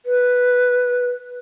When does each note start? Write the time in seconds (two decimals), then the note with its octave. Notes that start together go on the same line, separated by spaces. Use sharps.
0.06 B4